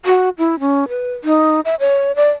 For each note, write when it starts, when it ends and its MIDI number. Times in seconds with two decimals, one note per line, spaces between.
0.06 0.29 66
0.38 0.59 64
0.60 0.88 61
0.89 1.13 71
1.24 1.60 63
1.65 1.75 76
1.80 2.15 73
2.16 2.31 74